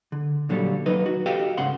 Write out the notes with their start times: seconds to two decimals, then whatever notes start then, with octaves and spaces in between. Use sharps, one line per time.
0.12 D3
0.49 A#2 D3 F#3 G3 A4
0.86 D#2 F#3 D#4 B4 D#5
1.06 F#4
1.26 F#4 G4 A4 D#5 F5 G5
1.58 G#2 C#3 F#5 C6